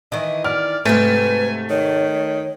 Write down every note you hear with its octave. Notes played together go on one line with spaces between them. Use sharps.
D#3 E3 D#5
D5 F6
G#2 C3 A3 C4 B4 G#5
D#3 C#5